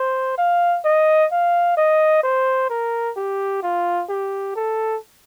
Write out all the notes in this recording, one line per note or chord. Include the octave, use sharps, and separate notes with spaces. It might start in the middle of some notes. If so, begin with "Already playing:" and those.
Already playing: C5
F5
D#5
F5
D#5
C5
A#4
G4
F4
G4
A4